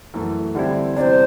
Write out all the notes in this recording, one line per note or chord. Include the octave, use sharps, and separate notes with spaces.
F#2 E3 A3
D3 G3 C4 E4
E2 C3 G3 D4 C5 D5